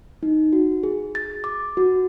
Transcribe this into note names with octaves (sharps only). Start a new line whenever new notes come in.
D#4
F#4
G#4
A6
D6
F#4